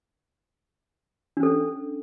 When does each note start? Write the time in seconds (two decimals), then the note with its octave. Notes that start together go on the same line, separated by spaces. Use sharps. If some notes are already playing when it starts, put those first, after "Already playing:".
1.37 D4
1.40 C#4
1.43 A4